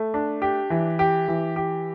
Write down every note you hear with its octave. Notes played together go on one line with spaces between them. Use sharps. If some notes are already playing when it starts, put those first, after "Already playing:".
Already playing: A3
D4
G4
E3
G4
E3
G4